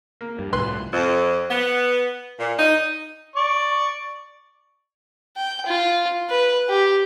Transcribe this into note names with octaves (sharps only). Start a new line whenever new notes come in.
A#3
G2
C2 A2 B4 C6
F2
B3
A#2
D#4
D5 C#6
G5
F4
B4
G4